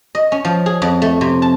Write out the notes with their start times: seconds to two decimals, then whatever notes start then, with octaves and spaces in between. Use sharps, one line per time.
0.15 D#5
0.32 C#4
0.45 F3
0.66 G#4
0.82 F2
1.02 A3
1.21 C3
1.42 A5